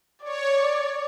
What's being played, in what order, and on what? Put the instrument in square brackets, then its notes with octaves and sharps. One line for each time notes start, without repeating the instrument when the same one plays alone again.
[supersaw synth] C#5 [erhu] D5